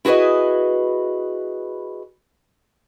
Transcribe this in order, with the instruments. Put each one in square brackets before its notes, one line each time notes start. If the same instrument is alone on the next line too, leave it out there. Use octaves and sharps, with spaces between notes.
[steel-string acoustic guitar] E4 F#4 G#4 B4 D#5